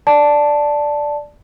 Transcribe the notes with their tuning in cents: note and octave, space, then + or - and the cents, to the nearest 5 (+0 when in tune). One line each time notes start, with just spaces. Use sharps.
D5 +0 A5 +0